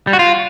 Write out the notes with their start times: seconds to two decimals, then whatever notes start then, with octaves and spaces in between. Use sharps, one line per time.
0.07 G3
0.13 F#4
0.19 F4